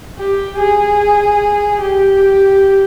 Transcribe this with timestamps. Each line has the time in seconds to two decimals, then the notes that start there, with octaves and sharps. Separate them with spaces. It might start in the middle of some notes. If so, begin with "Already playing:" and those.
0.18 G4
0.58 G#4
1.81 G4